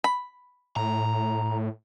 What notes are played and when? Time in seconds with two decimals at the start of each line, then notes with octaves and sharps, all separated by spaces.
0.04 B5
0.77 A2 A#5